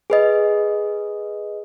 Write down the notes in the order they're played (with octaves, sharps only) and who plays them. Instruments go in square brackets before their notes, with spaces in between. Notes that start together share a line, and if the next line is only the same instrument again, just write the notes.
[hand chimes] G#4 B4 D#5